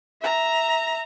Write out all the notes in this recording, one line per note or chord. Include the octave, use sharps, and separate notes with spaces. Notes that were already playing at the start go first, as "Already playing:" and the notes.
E5 A#5